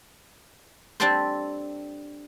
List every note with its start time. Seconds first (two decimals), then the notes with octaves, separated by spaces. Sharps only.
1.00 G3 C4 D4 G4 A4 C5